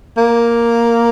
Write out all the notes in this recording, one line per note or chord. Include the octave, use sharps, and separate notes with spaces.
A#3